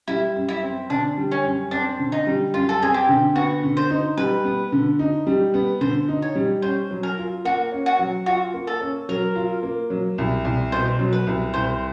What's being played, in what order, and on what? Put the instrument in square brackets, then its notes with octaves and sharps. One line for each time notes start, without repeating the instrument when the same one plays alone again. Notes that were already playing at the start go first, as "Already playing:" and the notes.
[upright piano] G3 [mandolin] E4
[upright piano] F#2
[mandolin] E4
[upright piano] C4
[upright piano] D3 [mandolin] D4
[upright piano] G3
[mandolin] C#4
[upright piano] F#2
[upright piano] C4 [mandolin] D4
[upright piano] D3
[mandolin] D#4
[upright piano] G3
[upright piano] F#2 [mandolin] F4
[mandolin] A4
[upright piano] C4 [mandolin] G#4
[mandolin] G4
[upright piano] D3
[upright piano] B3 [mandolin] F#4
[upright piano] D3
[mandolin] C5
[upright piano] D#4
[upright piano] G3 [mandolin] B4
[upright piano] B3
D3
D#4
G3
B3
[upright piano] D3 [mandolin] C5
[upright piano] D#4
[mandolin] C#5
[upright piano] G3
[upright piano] C#4 [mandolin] C5
[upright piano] F#3
[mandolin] A#4
[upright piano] F4
[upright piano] A#3 [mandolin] F#4
[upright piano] C#4
[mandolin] F#4
[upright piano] F#3
[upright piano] F4 [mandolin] F#4
[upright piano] A#3
[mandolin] A4
[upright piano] C#4
[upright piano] F#3 [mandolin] A#4
[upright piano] F4
A#3
F#3
C2
C2
[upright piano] B2 [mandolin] C5
[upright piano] F#3
[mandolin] B4
[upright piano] C2
[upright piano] C2 [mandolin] C5